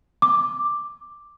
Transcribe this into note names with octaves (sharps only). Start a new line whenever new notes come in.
D6